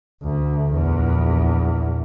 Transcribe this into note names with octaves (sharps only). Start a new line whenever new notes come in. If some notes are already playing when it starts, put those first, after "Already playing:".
D2
A#1 E2